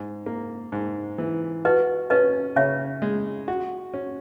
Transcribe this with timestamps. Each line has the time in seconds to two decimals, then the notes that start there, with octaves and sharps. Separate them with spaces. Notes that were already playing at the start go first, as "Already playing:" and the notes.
Already playing: G#2
0.26 A#3
0.72 G#2
1.18 E3
1.65 F#4 B4 D#5
2.10 C#4 B4 D#5
2.56 C#3 C#5 E5
3.02 G#3
3.48 F#4
3.94 C#4